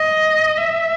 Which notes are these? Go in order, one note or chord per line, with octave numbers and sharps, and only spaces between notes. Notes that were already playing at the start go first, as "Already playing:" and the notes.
Already playing: D#5
E5